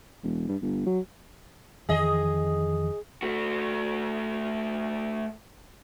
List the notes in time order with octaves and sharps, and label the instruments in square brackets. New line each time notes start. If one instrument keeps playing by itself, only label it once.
[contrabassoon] E1
G2
G1
F#3
[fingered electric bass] F2 D#3 E3 [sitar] G#4 D#5
[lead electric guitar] A3 F#4